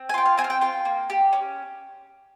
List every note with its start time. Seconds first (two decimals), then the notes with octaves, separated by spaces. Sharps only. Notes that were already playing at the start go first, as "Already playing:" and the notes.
Already playing: C4
0.09 G#5
0.14 F4 G5
0.26 F5
0.37 C4 G#5
0.44 F5
0.50 G5
0.61 F4 G5
0.85 A#3
1.10 G4
1.33 C#4